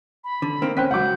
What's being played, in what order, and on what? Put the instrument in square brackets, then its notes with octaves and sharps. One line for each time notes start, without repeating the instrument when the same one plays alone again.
[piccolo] B5
[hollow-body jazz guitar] D3
D#3 A#3 C4
[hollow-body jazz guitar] C#4 [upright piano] C5 G5 B6 [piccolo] F#6
[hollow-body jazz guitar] C#2 F#3 [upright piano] F#5 D6 [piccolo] G6